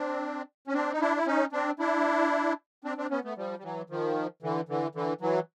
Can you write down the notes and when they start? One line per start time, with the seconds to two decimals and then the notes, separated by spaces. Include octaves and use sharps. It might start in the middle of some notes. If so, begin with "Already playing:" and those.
Already playing: C4 D4
0.68 C#4
0.73 C4 D4
0.93 D#4
1.00 D4 E4
1.17 E4
1.27 C#4 D#4
1.53 C4 D4
1.79 D4 E4
2.84 C4 D4
2.98 C4 D4
3.10 B3 C#4
3.24 A3 B3
3.37 F3 G3
3.59 G3
3.63 E3 F#3
3.90 D#3 F3
4.42 D3 E3
4.69 D3 E3
4.95 D3 E3
5.21 E3 F#3